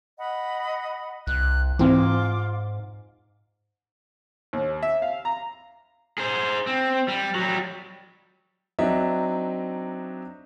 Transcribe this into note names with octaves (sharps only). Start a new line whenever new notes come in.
D#5 F#5 B5
C2 F#6
G#2 E3 C4 F4 D6
D#2
E5
F5
A#5
G#4 C5
C4
G3
F#3 G3
F#3 C4 D4 D#4 D#5 E5